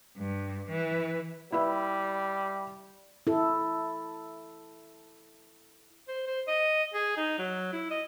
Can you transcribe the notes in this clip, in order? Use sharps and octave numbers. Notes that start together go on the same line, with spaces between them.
G2
E3
G3 E4 B4 E5
E4 A4
C5
C5
D#5
G#4
D#4
F#3
E4
D#5